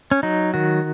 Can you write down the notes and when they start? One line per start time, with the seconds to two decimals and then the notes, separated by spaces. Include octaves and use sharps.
0.11 C#4
0.23 F#3 D#4
0.54 D#3 F#4